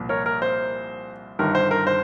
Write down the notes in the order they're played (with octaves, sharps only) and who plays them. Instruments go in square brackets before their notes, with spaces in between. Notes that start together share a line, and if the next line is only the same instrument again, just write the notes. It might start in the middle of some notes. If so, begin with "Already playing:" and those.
Already playing: [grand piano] C2 A#2 F3
A#4 C#5
A#4
C5
G1 G2 D#3 A#4
C5
A#4
C5